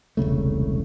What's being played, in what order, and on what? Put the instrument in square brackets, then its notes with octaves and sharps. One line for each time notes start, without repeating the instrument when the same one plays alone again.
[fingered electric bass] E1 C2 C#3 A3